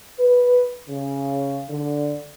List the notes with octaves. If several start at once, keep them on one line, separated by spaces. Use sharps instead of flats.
B4
C#3
D3